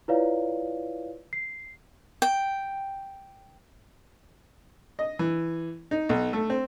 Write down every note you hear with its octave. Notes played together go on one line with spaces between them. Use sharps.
E4 F4 B4 C#5 D5 F5
C7
G5
D#5
E3
D#4
B1
A3
C4